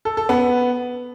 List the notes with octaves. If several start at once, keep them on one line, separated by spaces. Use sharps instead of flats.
A4
A4
B3